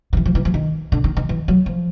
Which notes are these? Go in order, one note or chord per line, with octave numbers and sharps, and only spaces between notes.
D#3
E3
F3
E3
F3
D#3
D3
D#3
D#3
E3
F#3
F3